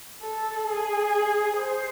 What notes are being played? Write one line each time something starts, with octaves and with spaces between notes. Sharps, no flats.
A4
G#4
C5